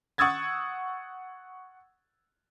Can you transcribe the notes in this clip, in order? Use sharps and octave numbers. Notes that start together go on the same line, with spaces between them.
F#5 C#6 D#6 E6 G#6 A6